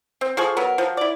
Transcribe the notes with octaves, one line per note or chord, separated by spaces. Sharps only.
C4
F3 G#4 A4 C#6
F#3 B3 A#4
F3 F#3
E4 D5